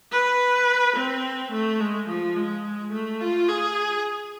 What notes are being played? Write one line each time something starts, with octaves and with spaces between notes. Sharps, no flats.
B4
C4
A3
G#3
F3
G#3
A3
F4
G#4